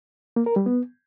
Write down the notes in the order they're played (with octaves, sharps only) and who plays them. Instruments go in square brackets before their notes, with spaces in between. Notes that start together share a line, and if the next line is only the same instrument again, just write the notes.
[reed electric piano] A#3
A#4
G3
B3